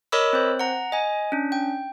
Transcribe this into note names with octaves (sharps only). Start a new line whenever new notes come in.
A#4 C#5 D#5 B5 D6 E6
C4 C5
F#5 A#5
D#5 G#5
C#4 D4
G5